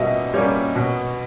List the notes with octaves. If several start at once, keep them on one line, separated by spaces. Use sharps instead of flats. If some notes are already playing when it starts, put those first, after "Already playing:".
Already playing: B2 G3 A#3 C#4 D#5 E5
G3 A#3 C#4 C#5
B2